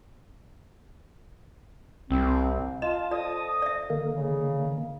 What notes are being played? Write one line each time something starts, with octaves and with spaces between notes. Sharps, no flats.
C2 C4
F4 D#5 A5
F2 D5 D#5 D#6
D5 E5
D3 D#3 A#3
C#3